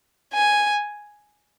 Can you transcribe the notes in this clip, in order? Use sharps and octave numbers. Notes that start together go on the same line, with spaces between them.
G#5